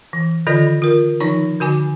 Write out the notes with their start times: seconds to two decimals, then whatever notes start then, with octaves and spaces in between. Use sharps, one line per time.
0.13 E3
0.47 D3 D#3 F4 A4 D5 D#5
0.82 F4 A#4
1.20 D#3 F3 D#4 A#5 C#6
1.60 D3 F#4 G#5 D6